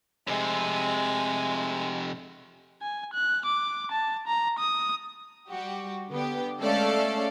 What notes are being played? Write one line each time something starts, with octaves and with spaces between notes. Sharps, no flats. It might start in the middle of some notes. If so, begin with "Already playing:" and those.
F2 C3 G#3
G#5
F#6
D6
A5
A#5
D#6
G3 F#4 G4
D3 B3 G4
G#3 A3 C#4 A4 D5 F5